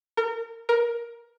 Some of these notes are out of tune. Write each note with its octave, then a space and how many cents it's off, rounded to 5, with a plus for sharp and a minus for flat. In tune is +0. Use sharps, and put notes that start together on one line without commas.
A#4 -25
A#4 +15